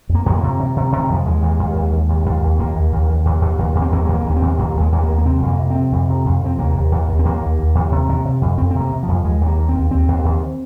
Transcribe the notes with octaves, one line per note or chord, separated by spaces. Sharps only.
F2
A#3
F2 G#3
A#3
C3
C3
C3
C3
D#3
F2 F3
D#2 G#3
D#2
D#2
D#2
D#2
D#2
D#2
D#2
D#2 A#3
D#2
D#2
D#2
D#2
D#2
D#2
D#2
C4
D#2 A#3
G#3
D#2
A#3
D#2
A#3
C4
D#2
D#2 A#3
D#2
G#3
D#2 G#3
A#3
D#2
A#3
C3 C4
F2
A#3
C3
C4
C3
F2
C3
F2
C3 C4
D#2 A#3
D#2
D#2
D#2
C4
D#2 A#3
D#2
D#2
D#2
C3
C3
C3
F2
F2 C4
C4
C3
A#3
C3
F3
F2
D#2 G#3
D#2
A#3
D#2
C4
D#2
D#2 C4
D#2
D#2